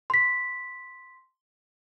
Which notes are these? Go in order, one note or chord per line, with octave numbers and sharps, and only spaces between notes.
C6 B6